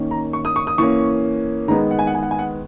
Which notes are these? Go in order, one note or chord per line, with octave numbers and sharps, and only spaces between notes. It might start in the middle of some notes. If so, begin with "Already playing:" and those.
Already playing: D#3 A#3 C#4
A#5
C#6
D#6
C#6
D#6
E3 A#3 C#4 C#6
D#3 G#3 B3 A#5
F#5
G#5
F#5
G#5
F#5
G#5
F#5